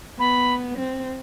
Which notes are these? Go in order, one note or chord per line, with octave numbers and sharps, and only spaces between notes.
B3 B5
C4